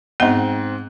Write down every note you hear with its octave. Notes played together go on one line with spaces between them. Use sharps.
G#2 B3 C4 D#5 F#5 G7